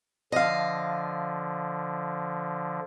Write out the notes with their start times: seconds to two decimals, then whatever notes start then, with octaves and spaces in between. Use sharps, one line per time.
0.32 D3 F3 D#5 F5